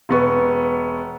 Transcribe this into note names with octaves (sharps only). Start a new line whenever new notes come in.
E1 B3 C#6